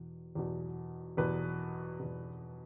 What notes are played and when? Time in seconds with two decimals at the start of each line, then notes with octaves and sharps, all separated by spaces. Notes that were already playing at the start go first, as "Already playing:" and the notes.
Already playing: E2 B2
0.35 E2 B2
1.17 E2 B2 B4
2.00 E2 B2